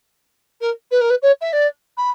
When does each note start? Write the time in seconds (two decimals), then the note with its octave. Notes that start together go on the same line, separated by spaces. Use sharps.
0.61 A#4
0.91 B4
1.01 A#4
1.10 B4
1.22 C#5
1.41 E5
1.53 D5
1.97 B5